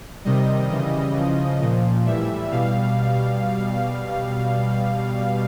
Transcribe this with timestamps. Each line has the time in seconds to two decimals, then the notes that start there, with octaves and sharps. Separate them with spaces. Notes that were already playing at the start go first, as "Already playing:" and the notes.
0.25 C3 D#3 G3 D#5
0.70 C#3 E3 G3 D#5
1.15 C#3 F3
1.60 A#2 F3
2.06 A2 E3 G3 E5
2.51 B2 G3 F5